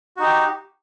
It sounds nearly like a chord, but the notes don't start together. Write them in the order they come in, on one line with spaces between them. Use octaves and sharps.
F#4 D#4 G4